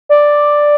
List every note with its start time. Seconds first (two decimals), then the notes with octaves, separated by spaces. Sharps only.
0.09 D5